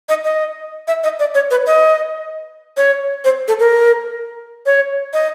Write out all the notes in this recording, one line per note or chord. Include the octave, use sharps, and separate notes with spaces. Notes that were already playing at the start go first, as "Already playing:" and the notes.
D#5
D#5
E5
D#5
D5
C#5
B4
D#5
C#5
C5
A4
A#4
C#5
D#5